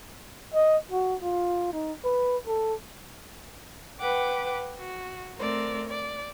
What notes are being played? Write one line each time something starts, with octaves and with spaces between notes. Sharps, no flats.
D#5
F#4
F4
D#4
B4
A4
B4 F#5 G5 D6
F#4
A3 C4 A#4 D5
D5